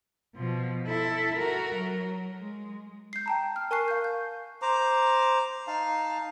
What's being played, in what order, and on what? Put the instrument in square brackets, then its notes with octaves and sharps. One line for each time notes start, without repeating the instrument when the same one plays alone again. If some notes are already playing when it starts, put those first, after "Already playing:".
[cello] B2 F3
E4 A4
F#4 A#4
F#3
G#3
[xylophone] G6 C7
G5 A5 A#5
F6
A#4 G#5 A5 C#6 F#6 C7
F5 G6
G6
[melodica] C5 A#5 D6
D#4 F5 A5